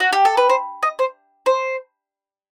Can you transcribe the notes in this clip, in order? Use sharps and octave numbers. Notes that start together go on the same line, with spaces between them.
F#4
G4
A4
B4
C5
D#5
C5
C5